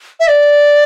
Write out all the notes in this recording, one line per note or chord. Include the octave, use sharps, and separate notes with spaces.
E5
D5